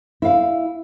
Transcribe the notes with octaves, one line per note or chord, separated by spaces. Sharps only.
E4 F5